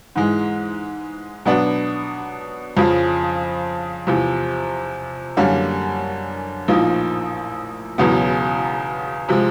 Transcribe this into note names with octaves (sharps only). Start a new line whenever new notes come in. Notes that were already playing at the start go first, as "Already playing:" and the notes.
G#2 E3 G#3
B2 F#3 B3 D4
F2 C#3 F3
E2 C3 F3
F#2 D3 G3 A#3 C#4
A#1 A2 F3 A#3 D#4
E1 E2 C#3 F#3 B3
C3 F3 G#3